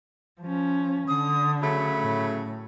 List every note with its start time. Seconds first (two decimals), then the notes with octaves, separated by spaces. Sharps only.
0.41 F3 C#4
1.08 D3 D#6
1.62 C#3 F#3 A3 B5
2.00 A2